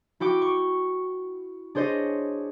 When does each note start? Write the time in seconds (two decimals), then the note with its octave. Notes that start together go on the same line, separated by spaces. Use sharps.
0.20 E4 F#4 G5 D6
0.42 C#6
1.75 D4 G#4 C5 C#5 D#5